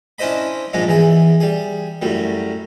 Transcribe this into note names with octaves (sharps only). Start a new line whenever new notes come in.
C#4 D4 E4 C5 D#5 B5
A#1 G#2 G#3 D4 D#4
E2 E3 G#4
G3 G#4
F#2 A2 G3